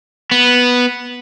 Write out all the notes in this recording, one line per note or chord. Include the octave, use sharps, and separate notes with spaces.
B3